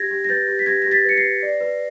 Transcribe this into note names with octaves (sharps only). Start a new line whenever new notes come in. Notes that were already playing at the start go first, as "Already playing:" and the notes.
Already playing: G4 G#6 A#6
G4
A#6
B4 G6 A6
G4
B6
G4 G#6 A#6
G4 A#6
A6 B6
B4 C#7
A#6 C7
B4
D5
B4